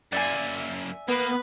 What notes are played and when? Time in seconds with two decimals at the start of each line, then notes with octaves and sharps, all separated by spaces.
0.12 F#2 A#3 D5 E5 G#5
1.08 A#3 B3 B4